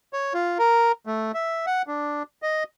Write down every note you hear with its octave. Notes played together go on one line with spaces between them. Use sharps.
C#5
F4
A#4
A3
E5
F#5
D4
D#5